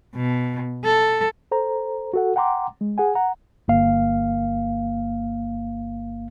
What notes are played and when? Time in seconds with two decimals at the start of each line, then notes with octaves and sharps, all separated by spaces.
0.15 B2
0.85 A4
1.52 A4 C5 A#5
2.13 F#4 A4 F#5
2.36 F#5 G5 A#5 C6 D6
2.81 G#3
2.98 G#4 F#5 G#5
3.15 F#5 A#5
3.68 G1 A#3 F5